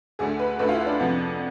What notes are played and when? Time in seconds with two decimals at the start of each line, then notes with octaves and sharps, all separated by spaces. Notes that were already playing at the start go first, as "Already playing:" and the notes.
0.19 D2 D3 A3 G#4
0.39 B4
0.59 D2 D3 A3 B4
0.69 F4
0.73 E4
0.86 D4
1.00 F2 C3 F3 B3